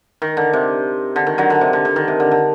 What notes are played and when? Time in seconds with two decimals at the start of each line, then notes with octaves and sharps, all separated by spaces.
0.22 D#3
0.37 D3
0.53 C3
1.16 D3
1.27 D#3
1.38 D3 F#3
1.50 D3
1.61 C3
1.73 D3
1.85 D3
1.96 D#3
2.08 C3
2.20 D3
2.31 D3